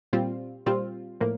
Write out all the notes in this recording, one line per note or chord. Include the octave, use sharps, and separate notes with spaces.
A#2 G3 C4 F4
A#2 G3 C4 F4
A2 F3 A#3